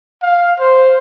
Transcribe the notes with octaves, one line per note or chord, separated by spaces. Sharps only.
F5
C5